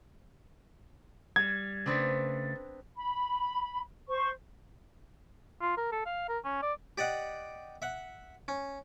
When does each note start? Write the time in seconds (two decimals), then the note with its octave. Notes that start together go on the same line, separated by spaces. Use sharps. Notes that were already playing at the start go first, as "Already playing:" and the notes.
1.36 G3 G#6
1.86 C#3 A3 B3 C4 D4
2.95 B5
4.08 C5 C#6
5.61 F4
5.77 A#4
5.92 A4
6.06 F5
6.29 A#4
6.44 C#4
6.62 D5
6.98 G4 D5 D#5 F#5
7.82 E5 F#5
8.48 C#4